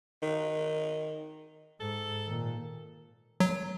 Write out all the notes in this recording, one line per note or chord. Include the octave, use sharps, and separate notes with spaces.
D#3
G#2 A4
A#2 D#3
F#3